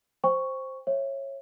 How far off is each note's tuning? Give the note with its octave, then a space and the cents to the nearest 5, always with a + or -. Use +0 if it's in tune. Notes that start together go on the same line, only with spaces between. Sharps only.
C5 +0 G5 +30 C#6 +0
C#5 -20 E5 +15